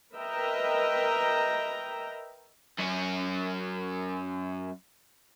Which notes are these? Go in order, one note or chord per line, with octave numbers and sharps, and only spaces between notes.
A#4 B4 D#5 E5 G5 A#5
F#2 C#4